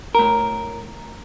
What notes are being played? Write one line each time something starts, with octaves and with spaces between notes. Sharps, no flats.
A2 A#4